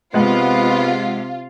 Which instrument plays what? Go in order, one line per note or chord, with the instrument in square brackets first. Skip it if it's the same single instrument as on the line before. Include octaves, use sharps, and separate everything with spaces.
[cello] C3 [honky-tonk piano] G#3 F#5 [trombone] B3 [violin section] F4